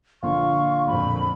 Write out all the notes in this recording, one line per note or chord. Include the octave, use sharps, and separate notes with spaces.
A#1 D3 F4 C#6
F2 A#2 B5